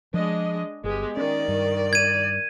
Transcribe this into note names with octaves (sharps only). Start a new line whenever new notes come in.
F3 G#3 D4 D#5
G1 G#3 B3 G4
D#3 C#4 D5
G2
G#6 D#7